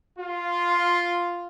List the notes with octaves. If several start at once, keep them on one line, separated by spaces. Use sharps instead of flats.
F4